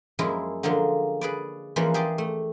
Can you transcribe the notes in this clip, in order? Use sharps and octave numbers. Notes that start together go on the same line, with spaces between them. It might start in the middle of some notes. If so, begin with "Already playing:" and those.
F#2 F3 G#3 A#3 E4 F4
D3 F3 F#3 G#3 A#3
G#4 B4 D5
E3 F3 G#3 A#3 C#4 F4
G4 G#4 D5 A5 C6
A3